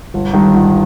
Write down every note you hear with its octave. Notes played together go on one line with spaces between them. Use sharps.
G1
G2 D#3
G1